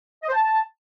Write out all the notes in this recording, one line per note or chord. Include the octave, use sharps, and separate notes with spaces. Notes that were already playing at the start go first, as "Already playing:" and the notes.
D#5
C5
A5